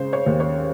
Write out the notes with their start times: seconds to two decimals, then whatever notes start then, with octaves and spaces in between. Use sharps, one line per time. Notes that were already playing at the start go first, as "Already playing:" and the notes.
Already playing: C#3 G#3 C5
0.13 C#5
0.26 D#2
0.40 C#5